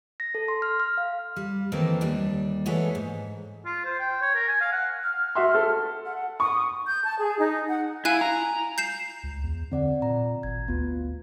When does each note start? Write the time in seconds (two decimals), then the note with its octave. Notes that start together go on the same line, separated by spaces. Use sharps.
0.20 A#6
0.35 A4
0.48 C6
0.62 F6
0.80 F6
0.97 F5
1.36 G3
1.72 D#3 E3 A3 A#3 C4 D#4
2.01 D#2 G3 D4
2.65 E3 G#3 A3 A4 C#5 F#5
2.95 G#2
3.65 F4
3.84 C5
3.99 G5
4.22 C#5
4.35 A#4
4.48 G#5
4.60 F5
4.72 F#5
5.03 F6
5.35 F#4 E5 C6
5.55 A4
6.05 F#5
6.40 C#6 D#6
6.85 G6
7.05 A5
7.18 G#4
7.38 D#4
7.69 F#5
8.05 E4 F5 G#5 F#6
8.21 A#5
8.78 G6 C7 E7
9.23 C#2
9.43 E2
9.72 D3 C4 D5 F#5
10.02 A#2 A#5
10.43 G#1 G#6
10.68 D2 B3 F4